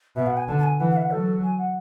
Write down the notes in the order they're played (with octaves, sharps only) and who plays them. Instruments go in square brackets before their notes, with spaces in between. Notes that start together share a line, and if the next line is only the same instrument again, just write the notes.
[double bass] B2 [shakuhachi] E5
[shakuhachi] F#5
G#5
[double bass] D3 [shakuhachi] A5
[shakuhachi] A5
G#5
[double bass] E3 [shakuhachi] F#5
[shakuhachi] F#5
E5
F#5
[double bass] F#3 [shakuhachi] A4
[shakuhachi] G#5
F#5